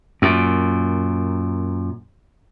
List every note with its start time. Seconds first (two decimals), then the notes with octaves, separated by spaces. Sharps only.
0.22 F#2 A#2